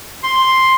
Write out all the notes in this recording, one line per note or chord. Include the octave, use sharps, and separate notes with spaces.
C6